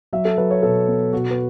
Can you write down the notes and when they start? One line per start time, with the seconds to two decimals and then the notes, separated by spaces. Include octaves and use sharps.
0.13 F#3 E5
0.25 A4
0.37 F#3 B4
0.51 C#5
0.63 B2 A4
0.88 B3
1.13 B2 F#4
1.30 B4